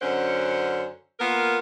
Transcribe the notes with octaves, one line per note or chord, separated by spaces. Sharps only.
F#2 D3 C#4 C5 F#5
A#3 B3 F4 A#4